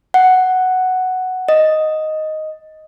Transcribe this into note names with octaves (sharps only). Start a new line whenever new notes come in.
F#5
D#5